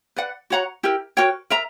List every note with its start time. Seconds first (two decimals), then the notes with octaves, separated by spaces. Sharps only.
0.16 B4 D5 F#5
0.50 F#4 C#5 F#5 A#5
0.83 E4 G4 A#4
1.17 F#4 A#4 C#5 G5
1.50 A#4 E5 A#5